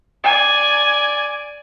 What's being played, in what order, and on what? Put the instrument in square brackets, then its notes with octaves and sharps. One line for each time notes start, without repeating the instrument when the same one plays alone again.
[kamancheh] D5 G#5